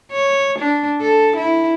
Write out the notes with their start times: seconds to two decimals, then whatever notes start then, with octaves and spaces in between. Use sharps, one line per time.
0.12 C#5
0.59 D4
1.01 A4
1.37 E4